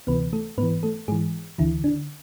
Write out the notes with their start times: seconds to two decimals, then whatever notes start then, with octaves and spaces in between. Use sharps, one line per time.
0.07 D2 C3 E3 B3 B4
0.33 A3 A4
0.58 G#2 B3 B4
0.62 E3
0.83 A3 A4
1.08 G#2 E3 G#3 G#4
1.58 D2 D3 E3 E4
1.84 D3 D4